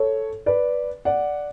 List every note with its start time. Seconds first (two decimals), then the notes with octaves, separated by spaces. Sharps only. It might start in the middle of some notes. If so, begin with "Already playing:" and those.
Already playing: A4 C#5
0.46 B4 D5
1.05 D5 F#5